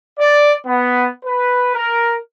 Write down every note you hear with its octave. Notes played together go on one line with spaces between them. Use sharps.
D5
B3
B4
A#4